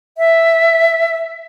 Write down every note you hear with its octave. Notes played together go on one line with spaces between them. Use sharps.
E5